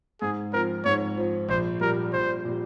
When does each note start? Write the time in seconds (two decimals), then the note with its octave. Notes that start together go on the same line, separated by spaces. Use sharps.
0.22 G#2 G#4
0.53 F3 C4 A#4
0.85 G#2 C#5
1.17 F3 C4
1.49 A#1 C5
1.81 A#2 G3 A#4
2.13 A#1 C5
2.45 A#2 G3